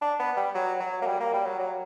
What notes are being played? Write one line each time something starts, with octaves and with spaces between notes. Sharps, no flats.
D4
B3
G3
F#3
F#3
A#3
G3
A#3
G3
F#3
F#3